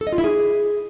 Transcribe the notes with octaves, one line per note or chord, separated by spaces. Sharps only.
A4
D#5
F4
E4
G#4